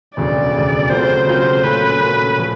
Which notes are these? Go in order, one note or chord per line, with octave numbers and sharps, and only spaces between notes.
E1 D2 C#3 F#3 D5
E1 D2 C#3 F#3
C#3 F#3 A3 C4 F4 C5
C#3 F#3 A3 C4 F4 C5
A#2 F#3 A3 C#4 B4
A#2 F#3 A3 C#4
A#2 F3 A3